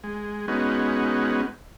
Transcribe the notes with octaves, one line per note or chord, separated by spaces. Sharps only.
G#3
G#3 B3 C#4 D#4 F#4